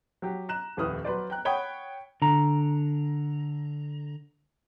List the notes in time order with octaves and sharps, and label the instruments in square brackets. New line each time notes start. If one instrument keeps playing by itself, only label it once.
[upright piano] F#3 G4
A#5 F#6 E7
D#1 F2 A2 B4 D#6 F6
F#3 B4 C5 D5
G5 A#5 F#6
C#5 F#5 G5 B5 D#6
[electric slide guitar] D3 A#5